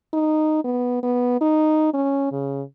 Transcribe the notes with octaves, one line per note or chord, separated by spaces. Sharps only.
D#4
B3
B3
D#4
C#4
C#3